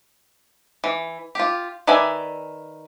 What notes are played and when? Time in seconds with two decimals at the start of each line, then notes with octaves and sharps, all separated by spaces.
0.84 E3
1.35 F4 G4
1.87 D#3 B4 D5 E5 G#5